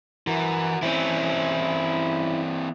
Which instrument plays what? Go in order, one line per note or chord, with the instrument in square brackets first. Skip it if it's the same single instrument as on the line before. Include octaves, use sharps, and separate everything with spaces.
[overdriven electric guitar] E3 [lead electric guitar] F#4 A#4
[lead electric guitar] E3 C4 [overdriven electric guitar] C#4 E4